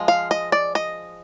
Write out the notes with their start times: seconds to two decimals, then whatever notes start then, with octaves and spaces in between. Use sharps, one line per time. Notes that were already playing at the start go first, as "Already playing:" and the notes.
Already playing: F3 G#3
0.08 F5
0.31 D#5
0.52 D5
0.75 D#5